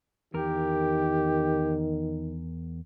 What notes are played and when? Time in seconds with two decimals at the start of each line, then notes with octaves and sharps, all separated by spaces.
0.34 E2 D#3 G4 A#4